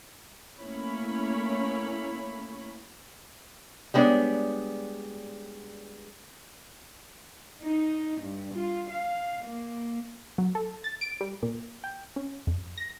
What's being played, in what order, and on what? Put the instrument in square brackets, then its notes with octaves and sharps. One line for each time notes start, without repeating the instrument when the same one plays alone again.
[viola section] A3 A#3 C#4 E4 C#5 B5
[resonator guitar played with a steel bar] G3 G#3 B3 D4 C#5 D5
[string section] D#4
G2
F4
F5
A#3
[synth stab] F#3
A4
A6
D7
G3
A#2
G5
C#4
F2
A#6